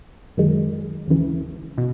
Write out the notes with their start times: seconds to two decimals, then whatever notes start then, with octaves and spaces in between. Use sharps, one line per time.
0.37 F#2 D#3 G#3
1.08 D#2 C#3 E3
1.78 B2